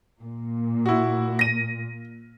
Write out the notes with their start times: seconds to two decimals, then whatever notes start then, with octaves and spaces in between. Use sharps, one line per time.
0.21 A#2
0.86 E4 F#4
1.39 A#6 D#7